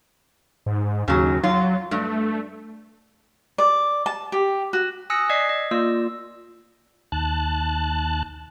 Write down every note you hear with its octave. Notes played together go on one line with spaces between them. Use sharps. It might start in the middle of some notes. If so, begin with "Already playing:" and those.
G#2
D#2 C#3 F#3
F#3 F4
G2 A3
D5
A5
G4
F#4
G#5 D#6 E6 F#6 A#6 C#7
D5 D#5 G#6 B6 C7
D#5
A#3 F4 D5 E6
D#2 A5 F#6